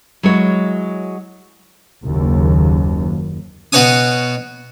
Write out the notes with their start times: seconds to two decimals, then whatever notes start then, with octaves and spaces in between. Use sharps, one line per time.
0.23 F#3 G#3 E4 C#5
2.03 F#1 D#2
3.72 B2 F#4 B4 C#5 G#5 D#6